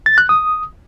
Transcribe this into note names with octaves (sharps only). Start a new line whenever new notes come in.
A6
F#6
D#6